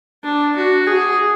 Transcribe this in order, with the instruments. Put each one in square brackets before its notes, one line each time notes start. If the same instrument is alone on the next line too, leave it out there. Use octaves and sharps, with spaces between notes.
[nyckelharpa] D4
F#4
G#4